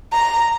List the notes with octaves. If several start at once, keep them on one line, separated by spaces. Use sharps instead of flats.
A#5